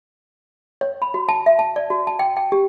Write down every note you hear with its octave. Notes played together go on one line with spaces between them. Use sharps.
C#5
B5
F#4
A5
E5
A5
D5
F#4
A5
G5
G5
G4